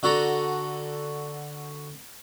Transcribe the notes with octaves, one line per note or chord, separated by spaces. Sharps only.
D3 F#4 A4 A#5